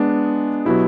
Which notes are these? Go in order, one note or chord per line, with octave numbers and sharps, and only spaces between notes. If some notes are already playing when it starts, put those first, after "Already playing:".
Already playing: G#3 B3 D4
B2 F#3 B3 E4 G4